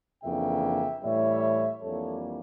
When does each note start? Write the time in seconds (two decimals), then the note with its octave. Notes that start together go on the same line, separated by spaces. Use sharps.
0.23 F2 C#3 E3 A#3 D4 E5 G5
1.02 A2 E3 G3 C#5 E5
1.82 F2 E3 G3 A#3 D4 A4 C#5